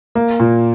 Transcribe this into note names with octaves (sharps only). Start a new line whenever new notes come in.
A#3
A#2